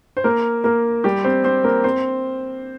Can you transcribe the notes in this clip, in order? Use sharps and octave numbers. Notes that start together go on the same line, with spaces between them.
C5
A#3 A#4
A#3 A#4
G3 G4
C4 C5
C4 C5
A#3 A#4
C4 C5